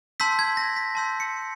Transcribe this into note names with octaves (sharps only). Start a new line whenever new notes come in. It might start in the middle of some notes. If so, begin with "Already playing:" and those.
A5 C6 E6 G6 B6
G#6
A#6
B6
A5 C6 E6 G6
C#7